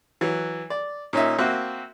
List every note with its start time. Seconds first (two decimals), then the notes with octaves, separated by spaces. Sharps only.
0.21 E3 F#3
0.70 D5
1.13 A#2 C#4 D#4 E5
1.38 A#3 C4 F#4 E5